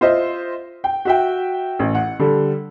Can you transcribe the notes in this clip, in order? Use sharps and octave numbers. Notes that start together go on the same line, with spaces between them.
F4 C5 D#5 E5
G5
F#4 E5 G5
A1
F#5
D3 G3 A4